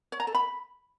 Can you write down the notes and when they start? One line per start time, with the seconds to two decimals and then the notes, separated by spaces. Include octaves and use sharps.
0.12 C#5
0.20 A#5
0.27 A4
0.35 B5